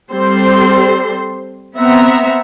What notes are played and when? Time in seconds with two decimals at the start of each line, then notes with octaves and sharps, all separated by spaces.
0.11 G3 C4 G4 A4 C5 C6
1.77 B3 C4 E5 F#5 A#5